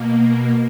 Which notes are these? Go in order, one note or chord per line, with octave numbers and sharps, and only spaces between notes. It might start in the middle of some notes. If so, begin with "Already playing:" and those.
Already playing: B2 A#3